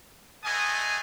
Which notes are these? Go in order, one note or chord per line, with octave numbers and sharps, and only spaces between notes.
G#3 A3 B3 D#5 G#5 D#6